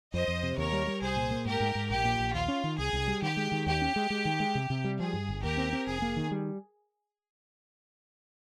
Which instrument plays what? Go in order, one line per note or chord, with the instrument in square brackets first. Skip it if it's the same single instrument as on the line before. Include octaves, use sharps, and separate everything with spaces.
[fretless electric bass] F2 [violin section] C5 D#5
[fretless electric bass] F2
C3
[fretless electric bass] D#2 [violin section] A#4 C#5
[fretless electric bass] G3
G3
[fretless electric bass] C2 [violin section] G#4 C5
[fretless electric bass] A#2
A#3
[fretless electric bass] G#2 [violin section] G4 A#4
[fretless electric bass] G#2
G#2
[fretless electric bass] A#1 [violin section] G4
[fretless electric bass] A#2
A#1
[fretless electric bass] D#2 [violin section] F4
[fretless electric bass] C#4
D#3
[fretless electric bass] C2 [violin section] G#4
[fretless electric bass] C2
G3
[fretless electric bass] D#3 [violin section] G4
[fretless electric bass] G#3
D#3
[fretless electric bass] D#2 [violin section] G4
[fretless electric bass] C#4
G#3
G#3
D#3
G#3
C3
C3
G3
[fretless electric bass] F3 [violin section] G#4
[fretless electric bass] G2
G1
[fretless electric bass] D#2 [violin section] G4 A#4
[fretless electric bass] C4
C4
[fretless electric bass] F1 [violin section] G#4
[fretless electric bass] A#3
D#3
G3